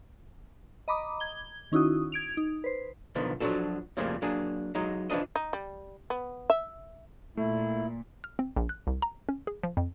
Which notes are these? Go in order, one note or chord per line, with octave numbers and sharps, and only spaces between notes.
D#5 A#5 B5 D6 D#6
G#6 G7
D#3 C#4 D#4 E4 F#4 D#6
G#6 D7 F7
D#4
B4 C5
B1 D3 D#3 F3 B3
F3 F#3 A3 D4 F#4 A4
F2 A2 C#3 F3 G3 A#3
F#3 A#3 D4 G#4
F#3 G#3 D#4
E3 F3 C4 D4 D#5
D#4
G3
B3
E5
A#2 A3 E4
F6
C4
A#1
F#6
C2
A#5
C#4
G#4
F3
F2